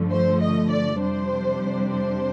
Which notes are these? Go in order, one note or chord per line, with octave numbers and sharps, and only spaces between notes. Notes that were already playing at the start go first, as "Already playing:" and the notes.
Already playing: G2 D3 F3 A3
C5
D#5
D5
F2 C3 G3 D4 C5
C5